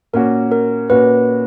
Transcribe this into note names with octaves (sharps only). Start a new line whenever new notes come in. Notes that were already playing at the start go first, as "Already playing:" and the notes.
A#2 A#3 C#4 F#4 A#4
A#4
A#2 A#3 C#4 F#4 B4